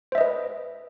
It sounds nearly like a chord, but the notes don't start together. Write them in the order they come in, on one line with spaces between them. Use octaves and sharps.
C5 E5 D#5 B4